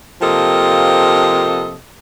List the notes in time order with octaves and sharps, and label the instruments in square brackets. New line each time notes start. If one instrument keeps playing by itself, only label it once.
[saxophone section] C3 F3 A#3 G4 A4 D#5